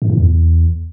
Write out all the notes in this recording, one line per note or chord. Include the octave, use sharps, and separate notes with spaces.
G#2
A2
E2